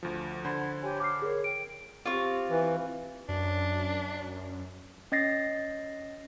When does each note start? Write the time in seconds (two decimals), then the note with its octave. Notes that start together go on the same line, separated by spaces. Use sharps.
0.03 D2 F3
0.45 D3 C5 F#5 B5 G#6
0.81 G4 C#5 G#5
1.00 D6 F6 C7
1.22 G#4 A#4 C#5
1.44 G5 D7
2.06 C4 F4 G4 C#6
2.50 E3
3.29 F#2 D4
5.12 C#4 D#5 A6 A#6 C7